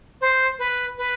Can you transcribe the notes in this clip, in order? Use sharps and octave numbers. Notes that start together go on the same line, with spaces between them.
C5
B4
B4